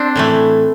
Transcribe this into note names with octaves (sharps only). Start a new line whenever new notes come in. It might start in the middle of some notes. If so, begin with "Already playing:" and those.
Already playing: C4 D4
A2 E3 A3